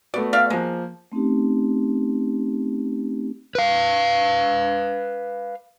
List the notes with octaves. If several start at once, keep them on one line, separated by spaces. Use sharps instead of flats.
A3 B3 F#4 D5
D5 E5 F5
F3 G#3 A#3
A3 C4 C#4 D#4 G4
B4 F5